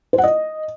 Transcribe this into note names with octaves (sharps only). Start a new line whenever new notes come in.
C5
F#5
D#5